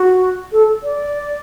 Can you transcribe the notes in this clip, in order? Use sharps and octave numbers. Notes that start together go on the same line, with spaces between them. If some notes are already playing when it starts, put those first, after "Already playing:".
Already playing: F#4
A4
D5